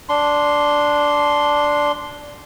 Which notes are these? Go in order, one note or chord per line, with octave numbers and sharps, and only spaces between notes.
D4 C6